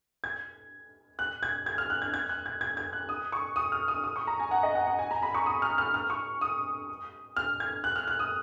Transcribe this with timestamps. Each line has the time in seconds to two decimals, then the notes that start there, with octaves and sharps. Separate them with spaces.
0.24 G#6
1.19 F#6
1.43 G#6
1.66 G#6
1.78 F6
1.90 F#6
2.02 G#6
2.14 G#6
2.29 F#6
2.46 G#6
2.61 G#6
2.77 G#6
2.93 F#6
3.09 D#6
3.32 C#6
3.56 D#6
3.72 F6
3.88 D#6
4.04 D#6
4.16 C#6
4.27 A#5
4.39 G#5
4.51 F#5
4.63 D#5
4.75 F#5
4.87 F#5
4.99 G#5
5.11 A#5
5.23 B5
5.34 C#6
5.46 D#6
5.62 F6
5.78 F6
5.94 F6
6.10 C#6
6.41 D#6
7.36 F6
7.60 G#6
7.84 F#6
7.96 F6
8.08 F#6
8.19 D#6